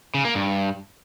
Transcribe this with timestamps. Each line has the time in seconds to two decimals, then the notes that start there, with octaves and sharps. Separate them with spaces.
0.14 C#3
0.25 A#3
0.35 G2